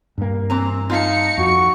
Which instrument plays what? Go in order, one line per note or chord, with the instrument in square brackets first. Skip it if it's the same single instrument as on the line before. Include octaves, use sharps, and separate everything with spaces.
[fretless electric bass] G2 A#3
[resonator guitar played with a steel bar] E3 C4 A#5
[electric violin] D#4 C#7 [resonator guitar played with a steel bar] F4 F5 A5
[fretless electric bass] F2 [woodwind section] F#4 C#6